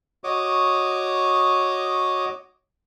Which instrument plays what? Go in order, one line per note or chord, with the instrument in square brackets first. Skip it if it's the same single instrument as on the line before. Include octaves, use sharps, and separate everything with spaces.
[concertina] F#4 C#5 D#5 D6 D#6